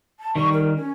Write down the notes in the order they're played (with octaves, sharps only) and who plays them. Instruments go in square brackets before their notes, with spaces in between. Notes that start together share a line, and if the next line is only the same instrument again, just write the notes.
[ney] A5
[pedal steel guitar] D#3 G3 [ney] C#6
[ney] A#4
C#4